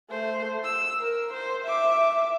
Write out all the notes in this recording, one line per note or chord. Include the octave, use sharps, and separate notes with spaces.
A3 C5
E6
A#4
C5
E5 D6